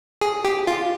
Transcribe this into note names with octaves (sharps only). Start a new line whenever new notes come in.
G#4
G4
F4